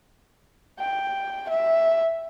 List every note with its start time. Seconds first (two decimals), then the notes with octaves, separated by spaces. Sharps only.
0.79 G5
1.49 E5